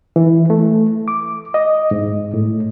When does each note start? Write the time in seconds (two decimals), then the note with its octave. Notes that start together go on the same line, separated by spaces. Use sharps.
0.16 E3
0.50 A3
1.08 D6
1.54 D#5
1.91 G#2
2.34 A2